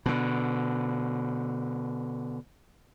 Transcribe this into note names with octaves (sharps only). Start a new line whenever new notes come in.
B2 D3